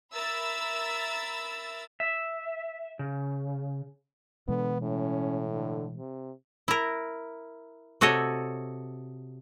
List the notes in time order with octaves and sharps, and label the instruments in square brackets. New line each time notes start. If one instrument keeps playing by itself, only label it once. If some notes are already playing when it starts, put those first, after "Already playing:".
[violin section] A#4 E5 B5 E6 A6
[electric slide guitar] E5
C#3
[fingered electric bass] B2 E3 G#3 [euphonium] D3 [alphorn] B3
[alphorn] A2 [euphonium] C#4
[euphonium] D3
C3
[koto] E4 A#4
C3 F#4 A4 C#5 D#5